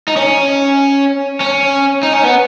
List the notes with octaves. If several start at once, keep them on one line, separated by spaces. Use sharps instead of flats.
D#4
C#4
C#4
D#4
C#4
B3